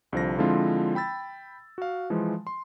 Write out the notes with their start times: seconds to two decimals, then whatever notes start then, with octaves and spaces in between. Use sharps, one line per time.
0.12 C2 D3 F3 C5 A#6
0.38 D3 F3 G#3 C4 E4 F4
0.95 G5 B5 E6 A6
1.78 F#4 F5
2.10 E3 F3 G#3
2.47 C6